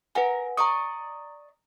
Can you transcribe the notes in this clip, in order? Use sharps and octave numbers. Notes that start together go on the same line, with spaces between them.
A#4 B4 F#5 G#5
D5 D#5 A#5 C#6 D#6